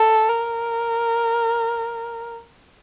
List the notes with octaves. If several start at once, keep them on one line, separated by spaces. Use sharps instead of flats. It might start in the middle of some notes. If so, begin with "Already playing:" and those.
Already playing: A4
A#4